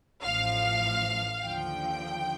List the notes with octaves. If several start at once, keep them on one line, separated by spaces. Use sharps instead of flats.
A1 A2 F3 F5
D#2 D3 F3 G5